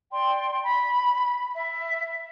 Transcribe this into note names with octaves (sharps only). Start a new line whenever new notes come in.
D5 G5 C6
B5
E5